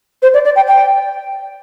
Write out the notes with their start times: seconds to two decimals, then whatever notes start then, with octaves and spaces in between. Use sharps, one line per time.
0.22 C5
0.34 D5
0.45 D5
0.56 G5
0.68 G5